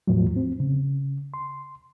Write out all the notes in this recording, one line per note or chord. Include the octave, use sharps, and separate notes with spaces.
E2 A2 F3 F#3
C4
C#3
C6